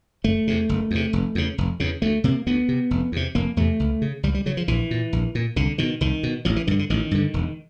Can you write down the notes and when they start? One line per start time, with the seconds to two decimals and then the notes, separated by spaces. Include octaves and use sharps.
0.24 F#1 A3
0.47 E2 C3
0.69 F#1
0.91 E2 C3
1.13 F1
1.35 E2 C#3
1.58 F1
1.80 E2 C#3
2.02 D2 A3
2.24 C3 A#3
2.46 D2 B3
2.68 C3
2.91 F1
3.12 E2 C3
3.35 F1 A#3
3.57 E2 C3 A3
3.80 C#2
4.02 C#3
4.23 C#2 G3
4.34 G3
4.46 C#3 F#3
4.57 F3
4.68 A#1 E3
4.91 A#2
5.13 A#1
5.35 A#2
5.56 C2 D3
5.78 B2 D#3
6.01 C2 D#3
6.23 B2
6.45 A1 F3
6.56 E3
6.67 G2 D3 D#3
6.79 D3
6.90 A1 D#3
7.11 G2 D3
7.34 E1